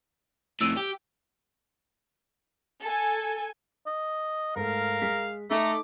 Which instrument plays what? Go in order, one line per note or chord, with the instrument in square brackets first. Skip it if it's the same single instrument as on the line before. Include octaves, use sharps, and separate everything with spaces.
[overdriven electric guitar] F2 A2 [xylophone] E6 D7 D#7
[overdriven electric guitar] G4
[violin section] A4 G#5
[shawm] D#5
[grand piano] G#2 A3 [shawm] A#4 [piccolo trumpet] F5
[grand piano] G#3 B6
[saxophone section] A3 [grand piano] D#4 A4 [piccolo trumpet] A#5 [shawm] D6